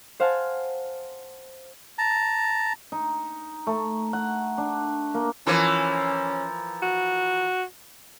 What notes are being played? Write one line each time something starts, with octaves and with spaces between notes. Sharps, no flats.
C5 F5 F#5 G#5 A5
A5 A#5
D#4
A3
F#5
D4
A#3
E3 F3 A#3 C#4
F#4